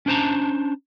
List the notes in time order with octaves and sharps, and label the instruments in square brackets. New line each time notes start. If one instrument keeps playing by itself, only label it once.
[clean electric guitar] C#4 D4 C5 A5 A#5